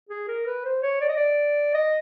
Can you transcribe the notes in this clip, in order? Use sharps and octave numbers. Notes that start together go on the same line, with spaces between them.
G#4
A#4
B4
C5
C#5
D5
D#5
D5
D#5